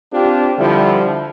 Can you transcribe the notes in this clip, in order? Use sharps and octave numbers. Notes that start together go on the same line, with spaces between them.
C4 D4 F4 G4
D3 F3 G3 E4